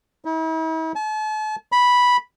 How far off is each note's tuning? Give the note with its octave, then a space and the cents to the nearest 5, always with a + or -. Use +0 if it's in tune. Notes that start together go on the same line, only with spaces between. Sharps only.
E4 -45
A5 -40
B5 -5